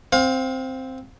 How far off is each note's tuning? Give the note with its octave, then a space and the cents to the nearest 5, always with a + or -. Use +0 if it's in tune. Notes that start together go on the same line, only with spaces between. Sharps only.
C4 +0 F5 +30